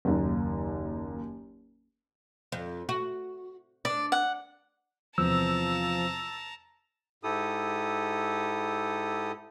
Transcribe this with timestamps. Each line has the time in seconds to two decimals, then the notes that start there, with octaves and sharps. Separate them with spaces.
0.05 F#1 D#2
2.52 F2
2.89 F#4
3.85 D4 D5
4.12 F#5
5.18 E2 C3 F3 A5 A#5 E6
7.23 G#2 E4 G4 A4 D#6